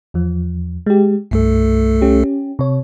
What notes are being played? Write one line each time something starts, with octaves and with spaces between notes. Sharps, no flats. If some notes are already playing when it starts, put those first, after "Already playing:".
E2 F3
G#3 G4
C2 G2 A3 A4
C#4 G4
C3 C#5